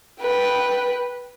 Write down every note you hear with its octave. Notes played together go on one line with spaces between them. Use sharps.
B4 G5